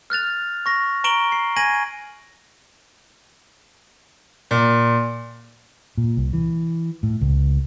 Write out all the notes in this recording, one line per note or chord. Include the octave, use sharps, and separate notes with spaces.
F6 F#6 A6 F7
C#6 A#6
A#5 C#6 D7 E7 F#7 G7
C7
G#5 G#6 A#6 D#7 F#7
A#2
A#2
C2
E3
A2
C#2